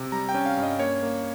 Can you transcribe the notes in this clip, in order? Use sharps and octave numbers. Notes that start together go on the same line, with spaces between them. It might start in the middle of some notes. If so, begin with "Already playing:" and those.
Already playing: C3
G3 A#5
G5
C#4
F5
G2
D#5
A#3 C#5
A#3